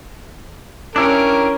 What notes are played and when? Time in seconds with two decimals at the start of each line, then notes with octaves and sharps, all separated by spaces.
0.96 C#4 D4 E4 G4 A#4